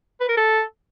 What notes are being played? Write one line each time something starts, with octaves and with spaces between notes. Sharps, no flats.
B4
A#4
A4